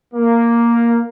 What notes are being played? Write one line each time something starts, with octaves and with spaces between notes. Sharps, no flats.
A#3